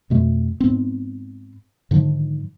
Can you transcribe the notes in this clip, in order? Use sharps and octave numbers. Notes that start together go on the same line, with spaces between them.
F2 B2 A3
G#2 B3 C4
G#2 D3 D#3 F3